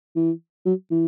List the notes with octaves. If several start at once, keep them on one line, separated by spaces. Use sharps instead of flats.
E3
F#3
E3